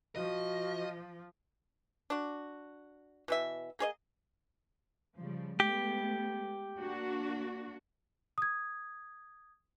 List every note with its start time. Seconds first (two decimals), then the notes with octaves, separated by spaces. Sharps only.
0.16 F3 F#4 D#5
2.10 D4 F#4
3.28 B2 E3 E5
3.79 A#3 G#4 C#5 D#5
5.17 C#3 F3 G3
5.60 G#3 A3 B3 G4
6.78 A#3 D4 F#4
8.38 D#6 G#6